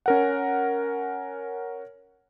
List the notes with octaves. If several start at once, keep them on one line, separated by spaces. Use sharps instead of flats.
C#4 A#4 F#5